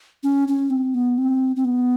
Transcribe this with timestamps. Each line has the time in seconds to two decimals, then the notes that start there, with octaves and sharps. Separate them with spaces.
0.23 C#4
0.48 C#4
0.70 C4
0.94 B3
1.18 C4
1.56 C4
1.65 B3